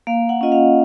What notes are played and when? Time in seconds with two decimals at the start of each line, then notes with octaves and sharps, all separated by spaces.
0.07 A#3 F5
0.29 F#5
0.41 C#4 F4 D#5
0.52 F5